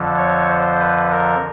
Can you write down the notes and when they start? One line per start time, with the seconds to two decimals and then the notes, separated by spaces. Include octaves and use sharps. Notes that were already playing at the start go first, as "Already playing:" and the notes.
Already playing: F2 D3 F3
0.18 C#5
0.49 C5
0.79 B4
1.11 A#4